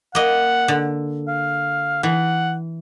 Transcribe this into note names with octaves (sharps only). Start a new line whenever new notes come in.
A#3 D#5 F#5
D3
F5
E3 F#5